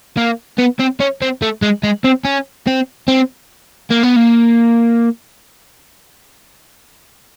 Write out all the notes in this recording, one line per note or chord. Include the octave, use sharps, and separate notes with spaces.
A#3
B3
C4
C#4
C4
A3
G#3
G#3
C4
C#4
C4
C4
A#3
B3
A#3